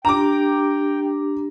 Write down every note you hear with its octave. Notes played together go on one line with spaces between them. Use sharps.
D4 G4 G5 A#5 D6